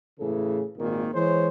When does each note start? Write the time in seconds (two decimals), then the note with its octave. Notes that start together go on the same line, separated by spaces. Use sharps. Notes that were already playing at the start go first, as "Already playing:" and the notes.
0.20 A2 C#3 E3 G#4 A4
0.78 G#1 A#2 D#3 A#3
1.14 E3 G#3 C5 C#5